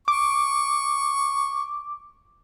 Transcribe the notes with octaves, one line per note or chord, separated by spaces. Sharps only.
C#6 D6